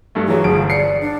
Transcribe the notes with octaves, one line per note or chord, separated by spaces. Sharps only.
G2 A3
E3 F#3 G#4
G1 F3 D7
D5 C7 C#7
D4